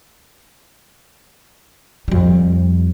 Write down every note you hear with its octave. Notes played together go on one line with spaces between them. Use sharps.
F2 G3